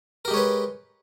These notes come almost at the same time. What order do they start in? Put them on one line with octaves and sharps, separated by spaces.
A#4 G4 G#3 C#5 B4